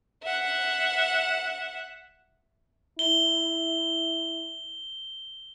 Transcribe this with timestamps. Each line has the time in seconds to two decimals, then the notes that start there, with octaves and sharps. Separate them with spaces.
0.24 E5 F#5
2.99 E4 G7